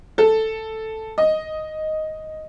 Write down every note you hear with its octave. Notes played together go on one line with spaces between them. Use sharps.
A4
D#5